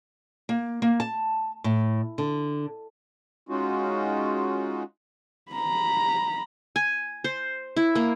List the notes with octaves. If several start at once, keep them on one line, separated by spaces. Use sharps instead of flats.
A#3
A#3
A5
A2
D3
G#3 C#4 D#4 F4 F#4
A#5 B5
G#5
C5
E4
A#3